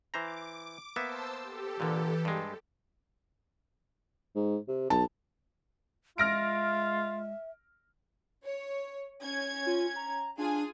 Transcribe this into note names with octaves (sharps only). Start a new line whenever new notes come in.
E3 C5 A#5 D6
A#3 B3 C5 E5 A5 E6
G4 A4
A#2 D3 E3
G2 G#3
G#2
C3
B1 A5
G#3 F4 E5 F6 A#6 D7
C#5
C#4 G#6
F4
A#5
D4 F4 G#4 G#5